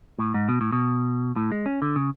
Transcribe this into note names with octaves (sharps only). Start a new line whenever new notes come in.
A2
G#2
B2
A2
B2
A2
G#3
C#4
D3
C#3